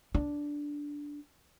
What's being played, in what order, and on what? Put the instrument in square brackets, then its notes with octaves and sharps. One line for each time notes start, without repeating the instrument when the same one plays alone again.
[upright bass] D4